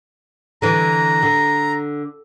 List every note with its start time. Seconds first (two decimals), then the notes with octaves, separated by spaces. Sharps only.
0.62 D3 E3 A#5
1.22 D3